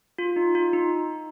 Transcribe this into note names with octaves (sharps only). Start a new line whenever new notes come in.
F4
D#4
F4
D#4